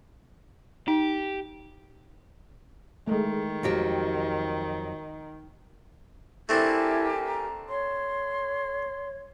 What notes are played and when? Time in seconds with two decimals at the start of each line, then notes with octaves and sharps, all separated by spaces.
0.88 D#4 G4
3.07 D#3 G#3 A3
3.63 F2 F#3 G4
6.49 A3 C4 D4 E4 G4 A#4 G#5
7.27 A#5
7.69 C#5 C6